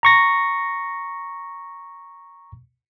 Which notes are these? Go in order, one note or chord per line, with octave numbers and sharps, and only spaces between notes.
A#5 C#6 A#6